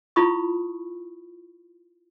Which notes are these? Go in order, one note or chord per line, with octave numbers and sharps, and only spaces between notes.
E4 F4 B5 C#6 D#6